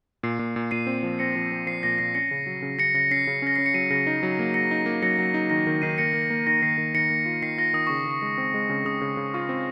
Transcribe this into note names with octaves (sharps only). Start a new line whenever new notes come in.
A#2 C7
A#2
A#2
A#2 C7 D#7
C4
F3
C4 A#6 C#7
F3
C4
F3 C7
A#2 A#6
A#2 C7
C#4 A#6 C#7
C#3
F#3
C#3
C#3 A#6 C#7
C#3 A#6 C#7
C#4 C7
C#3
C#4 A#6
C#4 C7
C#7
F#3 C7 D#7
C#3 A#6
D#4
F#3
A#3
F#3 A#6 C#7
D#4
A#3
F#3 A#6 C#7
F#3
D#4
D#3 A#6
D#3
D#3 C7 D#7
A#3 A#6 C#7
A#3
A#3
D#3 A#6
D#3 C7
D#3
D#3 A#6 C#7
A#3
F4
D#3 C7
F4 A#6
D#3 D#6
C#3 C#6
C#3
C#6
G#3
C4
G#3
C#3
C#3 D#6
C#3
C#3
F4 C#6
C4